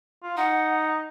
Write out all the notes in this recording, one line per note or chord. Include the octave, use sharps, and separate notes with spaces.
F4
D#4 F#5